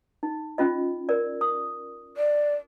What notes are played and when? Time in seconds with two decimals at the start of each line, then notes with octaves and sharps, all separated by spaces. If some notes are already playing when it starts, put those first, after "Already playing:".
0.23 D#4
0.58 C#4 F4 D#5
1.09 A#4 D5
1.41 D#6
2.17 D5